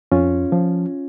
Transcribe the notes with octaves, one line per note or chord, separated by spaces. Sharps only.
F2 C#4 F4
F3